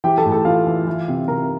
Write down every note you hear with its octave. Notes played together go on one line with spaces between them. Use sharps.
E3 G4 G5
A4 A5
A2
A4 A5
E3 F4 F5
E3
E3
C3
C3 A#4 A#5